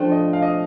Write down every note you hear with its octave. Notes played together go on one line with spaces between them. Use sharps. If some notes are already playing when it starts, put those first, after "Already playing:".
Already playing: F3 A3 D4 F4 C5 G5
D#5
F5
D#5